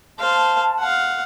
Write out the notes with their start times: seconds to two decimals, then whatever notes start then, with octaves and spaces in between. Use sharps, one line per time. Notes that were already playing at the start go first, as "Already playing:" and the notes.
0.19 C5 F5 A5
0.79 F5 F#5